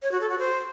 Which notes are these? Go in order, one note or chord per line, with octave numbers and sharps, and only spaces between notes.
C#5
F#4
A4
F#4
C5